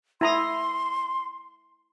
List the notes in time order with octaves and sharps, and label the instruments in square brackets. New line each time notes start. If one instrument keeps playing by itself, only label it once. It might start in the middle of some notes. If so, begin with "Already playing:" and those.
[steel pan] E4 A#5 D#6 [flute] C6